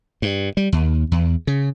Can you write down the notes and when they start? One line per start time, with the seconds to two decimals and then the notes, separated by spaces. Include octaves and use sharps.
0.22 G2
0.57 G3
0.72 D#2
1.12 E2
1.47 C#3